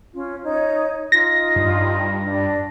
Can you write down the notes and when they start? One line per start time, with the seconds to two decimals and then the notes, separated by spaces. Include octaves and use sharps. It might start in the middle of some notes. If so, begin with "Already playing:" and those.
0.14 C#4 F4
0.44 D#4 C#5 G6
1.12 D#4 F4 A#6
1.56 G2
2.22 D4